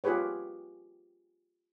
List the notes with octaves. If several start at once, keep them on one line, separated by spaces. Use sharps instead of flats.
F4 G4 G#4 B4 C#5